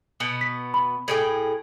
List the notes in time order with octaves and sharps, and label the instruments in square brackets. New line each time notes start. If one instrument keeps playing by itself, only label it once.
[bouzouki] B2 B3
[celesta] B6
B5
[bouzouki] A2 G#4 G5